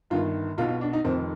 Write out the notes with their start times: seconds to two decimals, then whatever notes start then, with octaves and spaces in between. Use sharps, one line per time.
0.10 G1 G2 D#3 F4
0.58 B1 B2 F4
0.69 F4
0.81 D4
0.93 D#4
1.04 F1 F2 D#3 C4